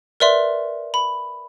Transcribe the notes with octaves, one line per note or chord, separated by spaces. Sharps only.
A#4 B4 D5 E5 C6
B5